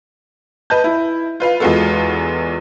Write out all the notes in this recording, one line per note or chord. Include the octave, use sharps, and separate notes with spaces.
B4 D#5 A5 G6
E4
F4 B4 F5
E2 G#3 B3 F4 F#4 A4